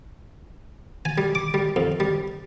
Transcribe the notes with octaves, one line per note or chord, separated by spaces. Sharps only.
G#5
G3
D6
G3
F2
G3